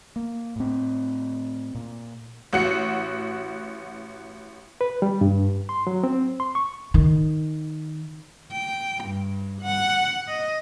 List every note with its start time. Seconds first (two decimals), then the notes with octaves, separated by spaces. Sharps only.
0.16 A#3
0.56 A2 C4
1.75 A#2
2.53 A1 F#4 C#7
4.81 B4
5.02 G3
5.21 G2
5.69 C6
5.87 F#3
6.04 C4
6.40 C6
6.55 C#6
6.94 D#3
8.53 G5
9.04 G2
9.62 F#5
10.28 D#5